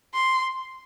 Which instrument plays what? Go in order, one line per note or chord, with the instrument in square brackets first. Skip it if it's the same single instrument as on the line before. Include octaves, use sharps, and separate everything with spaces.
[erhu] C6